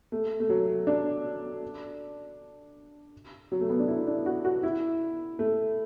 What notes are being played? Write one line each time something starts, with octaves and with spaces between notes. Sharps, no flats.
A3
A3
F#3
D4
F#3
A3
B3
D4
E4
D4
F#4
F#4
E4
A3